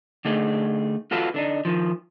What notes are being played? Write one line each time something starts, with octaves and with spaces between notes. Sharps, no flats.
D3 A3 D#4 G#4
F4 F#4 A4 B4 F5
D3 D4 D#4
D#3 F3